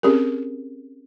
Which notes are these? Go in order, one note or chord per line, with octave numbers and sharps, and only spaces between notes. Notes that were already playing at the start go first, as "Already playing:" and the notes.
C4 C#4 G4 G#4 A#4